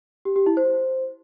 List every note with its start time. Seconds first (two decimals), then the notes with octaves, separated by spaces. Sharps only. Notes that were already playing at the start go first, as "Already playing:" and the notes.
0.25 G4
0.36 G4
0.46 E4
0.57 C5